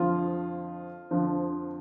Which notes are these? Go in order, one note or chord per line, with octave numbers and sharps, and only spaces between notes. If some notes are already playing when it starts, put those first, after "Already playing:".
Already playing: F2 D3 F3 F4
F2 D3 F3